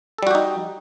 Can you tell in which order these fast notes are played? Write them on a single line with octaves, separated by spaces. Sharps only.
A4 G3 F#4 G4 D#4